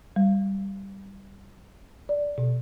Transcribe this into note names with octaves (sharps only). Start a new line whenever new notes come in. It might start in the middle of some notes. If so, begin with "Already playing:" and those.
G3
D5
B2